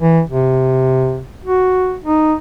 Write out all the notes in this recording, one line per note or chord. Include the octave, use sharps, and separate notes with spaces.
E3
C3
F#4
D#4